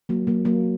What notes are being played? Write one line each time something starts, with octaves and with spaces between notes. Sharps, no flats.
F#3 A#3
F#3 A#3
F#3 A#3